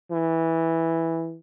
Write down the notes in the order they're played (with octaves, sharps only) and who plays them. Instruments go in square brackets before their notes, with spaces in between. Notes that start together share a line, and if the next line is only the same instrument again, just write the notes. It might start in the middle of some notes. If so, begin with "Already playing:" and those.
[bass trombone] E3